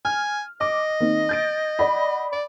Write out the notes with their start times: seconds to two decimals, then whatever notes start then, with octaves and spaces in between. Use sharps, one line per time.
0.05 G#5 F6
0.61 D#5 D6
1.00 D#3 A#3 C4
1.29 G6 A6 D7
1.79 D5 F#5 B5
2.32 D5